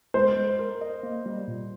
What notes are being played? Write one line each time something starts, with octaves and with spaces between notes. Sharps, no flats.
G#3 C5
G#3
A#4
D#5
A#3
G3
A#2